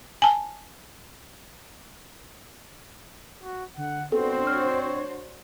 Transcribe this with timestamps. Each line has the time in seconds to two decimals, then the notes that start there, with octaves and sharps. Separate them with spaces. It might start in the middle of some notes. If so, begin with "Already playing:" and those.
0.22 G#5 A5
3.43 F#4
3.77 D3 F#5
4.12 B3 C4 D4 F#4 A4 C5
4.47 C#5 F6